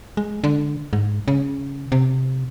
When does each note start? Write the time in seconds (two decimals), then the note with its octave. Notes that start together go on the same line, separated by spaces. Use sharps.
0.17 G#3
0.44 D3
0.93 G#2
1.28 C#3
1.92 C3